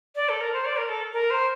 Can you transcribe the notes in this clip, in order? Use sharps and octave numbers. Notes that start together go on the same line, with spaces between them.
D5
A4
A#4
C5
D5
A#4
A4
A#4
C5